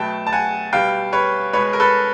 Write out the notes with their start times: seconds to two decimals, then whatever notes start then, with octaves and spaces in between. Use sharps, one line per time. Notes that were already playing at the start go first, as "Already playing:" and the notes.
Already playing: B2 F#3 A3 G5 A5
0.27 A5
0.32 F#5 G#5
0.73 B2 G3 F5 G5
1.12 B4 C#5
1.53 B2 G#3 B4 C#5
1.73 A#4
1.80 A4 B4